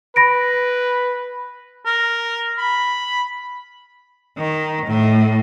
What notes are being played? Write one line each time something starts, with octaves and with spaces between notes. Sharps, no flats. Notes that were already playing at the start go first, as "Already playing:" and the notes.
B4 B5 A#6 D7
A#4
B5
D#3
A2